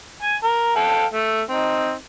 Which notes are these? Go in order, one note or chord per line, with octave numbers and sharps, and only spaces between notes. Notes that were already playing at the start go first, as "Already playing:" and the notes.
G#5
A#4
A4 F5 G5
A3 E5
C4 D#4